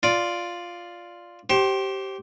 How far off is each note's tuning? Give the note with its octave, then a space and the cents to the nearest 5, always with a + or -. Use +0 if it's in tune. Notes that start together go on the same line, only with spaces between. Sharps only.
F4 +0 D5 +0
G4 -20 C5 +25